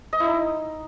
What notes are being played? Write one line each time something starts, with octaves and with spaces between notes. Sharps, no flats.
D#5
E4
D#4